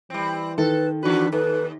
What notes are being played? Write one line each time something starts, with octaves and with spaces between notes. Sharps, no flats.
E3 G3 C4
D#3 A4 B4
E3 D4 F#4 B4
D#2 A4 B4